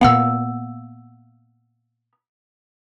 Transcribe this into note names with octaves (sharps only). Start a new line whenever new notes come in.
A#2 B3 F5 F#5 E6